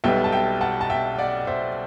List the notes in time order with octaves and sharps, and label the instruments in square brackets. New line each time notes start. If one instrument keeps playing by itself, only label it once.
[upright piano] B1 B2 G3 B3 E5 G5
A5
E5 G5
F#5 A5
A5
E5 G5
D5 F#5
C5 E5